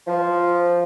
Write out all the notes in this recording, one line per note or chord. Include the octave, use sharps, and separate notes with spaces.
F3